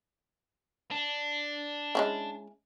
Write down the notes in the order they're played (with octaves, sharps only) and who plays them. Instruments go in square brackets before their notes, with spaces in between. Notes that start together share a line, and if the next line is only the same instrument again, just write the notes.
[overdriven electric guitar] D4
[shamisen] G#3 C#4 E4